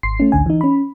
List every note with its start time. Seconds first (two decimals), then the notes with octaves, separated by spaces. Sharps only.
0.03 G#1 C6 C7
0.20 A3 C#4
0.32 A1 D2 D3 G#5
0.46 E3 D#4
0.61 C#4 B5